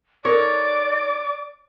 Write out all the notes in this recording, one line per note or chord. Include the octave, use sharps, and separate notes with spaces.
D#4 A4 A#4 C#5 D5 D6